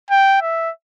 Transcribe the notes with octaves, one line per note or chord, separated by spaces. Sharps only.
G5
E5